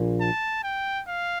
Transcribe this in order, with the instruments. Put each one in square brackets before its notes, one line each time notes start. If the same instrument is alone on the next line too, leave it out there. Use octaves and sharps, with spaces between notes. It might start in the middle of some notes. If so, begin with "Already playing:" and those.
Already playing: [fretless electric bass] A#1 A#2
[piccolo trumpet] A5
G5
F5